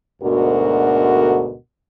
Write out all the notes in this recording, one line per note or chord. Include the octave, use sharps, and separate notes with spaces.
D2 G#2 B2 D3 F#4 A#4